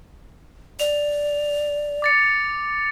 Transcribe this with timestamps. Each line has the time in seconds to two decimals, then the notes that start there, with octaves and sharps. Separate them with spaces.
0.80 D5 F7
2.02 D6 A6 C#7